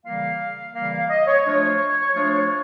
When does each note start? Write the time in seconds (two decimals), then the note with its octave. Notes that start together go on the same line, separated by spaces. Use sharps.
0.04 C#3 E3 G3 A#3 F5
0.74 C#3 E3 G3 A#3 F5
0.92 F5
1.09 D#5
1.27 C#5
1.44 F3 A3 D4 F4 C#5
2.14 F3 A3 D4 F4